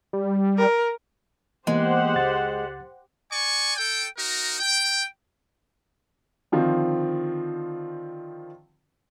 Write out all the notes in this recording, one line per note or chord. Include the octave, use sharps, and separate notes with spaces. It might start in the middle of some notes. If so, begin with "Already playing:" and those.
G3
A#4
E3 G#3 A#3 B3 G4 C5 F#5
C#2 A6
D5 G#5 C#6
A4 G5
D#4 F#4 A#4
G5
D3 D#3 F3 C4